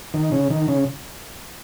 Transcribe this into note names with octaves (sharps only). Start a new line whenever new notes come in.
D#3
C#3
D#3
C#3